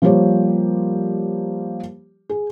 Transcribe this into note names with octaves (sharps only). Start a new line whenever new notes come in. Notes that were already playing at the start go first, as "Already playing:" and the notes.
F3 G3 A#3 G4 C5 C#5
G#4